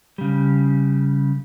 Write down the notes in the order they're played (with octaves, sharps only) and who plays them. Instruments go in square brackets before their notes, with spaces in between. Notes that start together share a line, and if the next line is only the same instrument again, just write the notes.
[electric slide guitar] C#3 G3